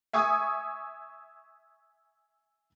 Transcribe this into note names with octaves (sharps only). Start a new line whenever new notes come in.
E5 G#5 C#6 D#6